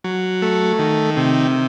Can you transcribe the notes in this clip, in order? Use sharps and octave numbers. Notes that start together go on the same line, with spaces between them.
F#3
A3
D#3
C3